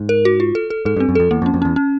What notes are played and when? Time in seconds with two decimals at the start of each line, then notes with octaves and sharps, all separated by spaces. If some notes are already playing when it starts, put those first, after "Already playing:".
Already playing: G#2
0.09 A#4
0.25 F#4
0.40 F4
0.55 A4
0.70 A4
0.85 G#2 A4
0.96 G2
1.00 C4
1.09 F#2
1.15 F2 A4
1.31 E2 A#3
1.42 F2
1.46 C#4
1.54 F2
1.62 E2 C#4
1.76 C#4